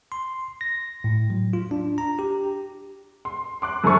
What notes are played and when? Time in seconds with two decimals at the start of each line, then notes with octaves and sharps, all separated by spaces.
0.12 C6
0.61 A#6
1.04 A2
1.30 F#3
1.53 F4
1.71 D4
1.98 A#5
2.19 G4
3.25 C6
3.62 C6 D6 F#6
3.84 F#2 D3 A4 C5 C#6